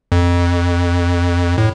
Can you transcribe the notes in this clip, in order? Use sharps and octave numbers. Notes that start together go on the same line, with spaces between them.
F2
A2